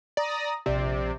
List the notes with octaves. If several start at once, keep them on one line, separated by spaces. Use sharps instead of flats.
D5 A#5 D#6 A#6
A#1 C3 D5